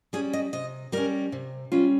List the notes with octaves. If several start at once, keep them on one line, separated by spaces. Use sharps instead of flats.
G3 C#4 G#4
D#5
C3 D#5
G3 C#4 A#4
C3
G3 C#4 F4